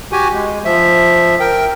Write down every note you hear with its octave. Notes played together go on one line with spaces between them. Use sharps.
F#4 G4 G#5
G#3
F3 E5
A#4 G5